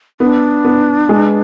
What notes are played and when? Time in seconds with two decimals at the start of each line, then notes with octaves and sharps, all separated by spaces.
0.20 B3 D4
0.65 B3
1.09 G#3